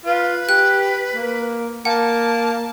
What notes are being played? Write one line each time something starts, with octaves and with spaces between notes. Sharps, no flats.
F4 B4
G4 F#6
A#3
A#3 F#5 A5